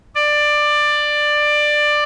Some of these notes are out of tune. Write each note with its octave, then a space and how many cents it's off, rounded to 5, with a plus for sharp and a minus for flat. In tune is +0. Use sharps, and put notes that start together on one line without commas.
D5 +15